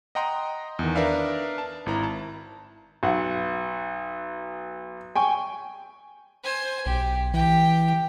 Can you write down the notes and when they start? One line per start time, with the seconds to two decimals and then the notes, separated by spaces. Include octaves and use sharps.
0.15 D#5 F#5 G5 A#5 C6 D#6
0.79 E2 D#3
0.95 D4 A#4 B4 D5 E5 F5
1.58 A5
1.86 G#1 E4 A#5
2.03 A5
3.03 B1 F#5
5.15 G5 G#5 C#6
6.43 C5 G#5
6.86 B1 G4
7.34 E3 G4 G5